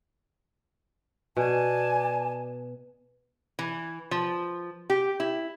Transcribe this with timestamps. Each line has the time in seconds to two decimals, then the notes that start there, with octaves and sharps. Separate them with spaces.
1.37 B2 D5 G#5 A5
3.59 E3
4.11 F3
4.90 G4
5.20 E4